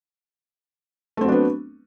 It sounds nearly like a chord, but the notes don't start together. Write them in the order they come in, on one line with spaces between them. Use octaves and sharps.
A3 C4 F#3 D4 B3